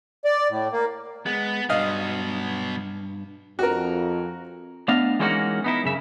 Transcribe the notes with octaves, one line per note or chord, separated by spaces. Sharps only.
D5
A2
A#3
G#3 B3
G2 B2 F#3 D#5 F5
F2 F#4 A#4
A3 B3 D4 D#5 F5
E3 G#3 A#3 C#4 D#4 F#4
B3 D#4 E4
F#2 C#3 E5